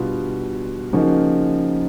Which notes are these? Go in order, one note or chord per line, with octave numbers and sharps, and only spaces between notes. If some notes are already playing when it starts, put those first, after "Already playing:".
Already playing: B2 G3 B3 D4 F4
C#3 F3 A#3 D#4 F#4